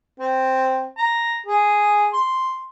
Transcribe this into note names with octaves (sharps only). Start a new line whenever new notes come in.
C4
A#5
G#4
C6